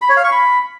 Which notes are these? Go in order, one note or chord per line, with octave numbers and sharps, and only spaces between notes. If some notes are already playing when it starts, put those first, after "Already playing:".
B5
C#5
F5
C#6
B5